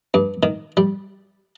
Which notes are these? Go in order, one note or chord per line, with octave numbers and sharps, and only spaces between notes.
G2
D#3
G3